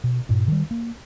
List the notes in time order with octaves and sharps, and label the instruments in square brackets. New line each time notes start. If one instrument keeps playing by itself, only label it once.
[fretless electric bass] B2
G2 A#2
D#3 G3
A#3